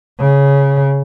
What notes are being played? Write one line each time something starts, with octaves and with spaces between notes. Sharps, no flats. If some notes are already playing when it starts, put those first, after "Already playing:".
C#3